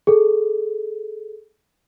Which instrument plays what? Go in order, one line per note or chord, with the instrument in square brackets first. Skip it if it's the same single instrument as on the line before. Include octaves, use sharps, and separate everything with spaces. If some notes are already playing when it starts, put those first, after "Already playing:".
[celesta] G#4 A4